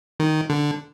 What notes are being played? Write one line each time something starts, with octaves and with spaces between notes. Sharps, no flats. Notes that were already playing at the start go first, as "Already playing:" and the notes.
D#3
D3